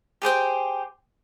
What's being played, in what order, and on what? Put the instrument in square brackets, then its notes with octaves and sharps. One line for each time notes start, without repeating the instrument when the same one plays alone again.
[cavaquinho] G4 G#4 C5 G5